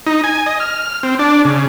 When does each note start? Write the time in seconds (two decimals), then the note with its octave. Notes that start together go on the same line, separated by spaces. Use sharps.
0.07 D#4
0.24 G#5
0.46 D#5
0.60 F6
1.03 C4
1.19 D4
1.45 C#3